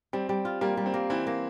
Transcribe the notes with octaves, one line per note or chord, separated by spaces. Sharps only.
G3 C4
G3
F4
G3 A#3
G3
C4
A#3
E3 C4 E4
A#3